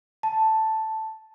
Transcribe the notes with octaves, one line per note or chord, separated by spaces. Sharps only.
A5